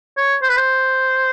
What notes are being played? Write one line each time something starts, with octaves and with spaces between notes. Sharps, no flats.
C#5
C5
B4
C5